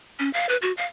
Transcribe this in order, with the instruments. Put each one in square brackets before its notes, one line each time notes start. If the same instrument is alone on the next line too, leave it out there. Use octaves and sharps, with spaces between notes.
[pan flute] C#4
F5
B4
F#4
F5